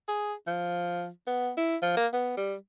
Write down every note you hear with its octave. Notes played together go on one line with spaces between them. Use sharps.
G#4
F3
B3
E4
F3
A#3
B3
G3